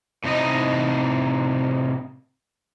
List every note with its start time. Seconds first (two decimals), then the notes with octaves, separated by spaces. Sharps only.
0.24 A2 C3 D#4 D#5